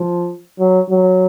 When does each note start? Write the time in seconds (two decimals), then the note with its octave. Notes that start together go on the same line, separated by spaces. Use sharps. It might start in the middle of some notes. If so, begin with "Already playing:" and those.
Already playing: F3
0.60 F#3
0.90 F#3